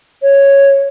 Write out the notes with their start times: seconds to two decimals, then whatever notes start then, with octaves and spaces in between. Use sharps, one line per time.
0.22 C#5